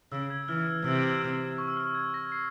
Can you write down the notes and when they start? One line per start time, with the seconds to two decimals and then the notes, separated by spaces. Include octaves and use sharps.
0.12 C#3 E6
0.30 G#6
0.48 E3 F6
0.66 E6
0.85 C3 E6
1.22 E6
1.58 C#6
1.68 E6
1.77 F6
1.95 G#6
2.14 A#6
2.32 C7